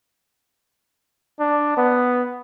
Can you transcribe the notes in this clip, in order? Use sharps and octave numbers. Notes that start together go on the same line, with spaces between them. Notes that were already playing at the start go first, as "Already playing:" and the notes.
D4
B3